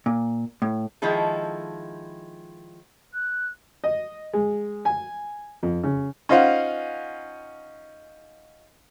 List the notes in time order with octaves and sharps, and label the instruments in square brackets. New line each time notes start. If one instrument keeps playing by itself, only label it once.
[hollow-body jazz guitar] A#2
A2
[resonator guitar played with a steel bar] D#3 F3 G#3 E4 A4
[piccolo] F#6
[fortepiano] D#5
G#3
G#5
F2
C#3
C#4 D#4 F4 C5 F5 F#5